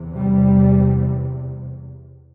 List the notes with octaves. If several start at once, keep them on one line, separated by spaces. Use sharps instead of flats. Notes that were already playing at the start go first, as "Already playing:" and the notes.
Already playing: E2 C3
G3